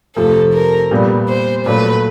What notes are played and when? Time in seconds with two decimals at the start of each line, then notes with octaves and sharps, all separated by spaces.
0.16 F2 C3 F3 A3 A4
0.54 A#4
0.91 A#2 G3 B3
1.29 C5
1.66 A#2 F#3 A3 B4